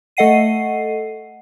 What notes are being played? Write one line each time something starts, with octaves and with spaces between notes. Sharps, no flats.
A3 A4 D#5 F#5 C7 D#7